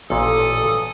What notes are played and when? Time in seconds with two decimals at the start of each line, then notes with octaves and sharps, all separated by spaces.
0.10 A1 A#2 A4 D#6